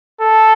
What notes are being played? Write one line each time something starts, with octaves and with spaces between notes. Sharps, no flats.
A4